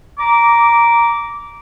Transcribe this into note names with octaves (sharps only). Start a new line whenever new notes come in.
A#5 D6